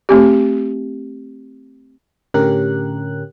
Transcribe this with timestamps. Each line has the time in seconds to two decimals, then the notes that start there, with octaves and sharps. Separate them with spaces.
0.09 A3 C4 G4
2.34 A2 D3 C#4 G4 A#4 F#6